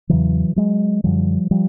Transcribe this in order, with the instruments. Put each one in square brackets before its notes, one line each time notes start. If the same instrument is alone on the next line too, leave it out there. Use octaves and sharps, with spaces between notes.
[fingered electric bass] E2 C#3 E3 F#3
F#3 G#3
F#2 D3 F3 G3
F3 G3